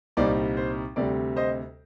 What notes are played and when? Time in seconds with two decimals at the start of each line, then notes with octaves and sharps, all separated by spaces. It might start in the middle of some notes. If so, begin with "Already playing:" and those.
0.17 C2 A#2 G3 C4 D#4 D5
0.57 C5
0.96 D2 C3 G3 D5
1.36 C5 D#5